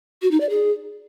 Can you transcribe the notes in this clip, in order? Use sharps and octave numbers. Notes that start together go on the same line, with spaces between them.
F#4
D#4
D5
G#4